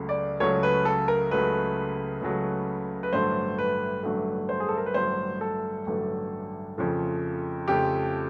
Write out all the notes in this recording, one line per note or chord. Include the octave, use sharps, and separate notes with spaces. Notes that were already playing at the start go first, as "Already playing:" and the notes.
Already playing: C#2 C#3 F#3 A3
D5
C#2 C#3 F#3 A3 C#5
B4
A4
A#4
C#2 C#3 F#3 A3 B4
C#2 C#3 F#3 A3
B4
A1 G2 D3 F#3 A3 C5
B4
A1 G2 D3 F#3 A3
C5
G#4
A4
A#4
B4
A1 G2 D3 F#3 A3 C5
A4
A1 G2 D3 F#3 A3
F2 C#3 F3 A3
F2 C#3 F3 A3 G4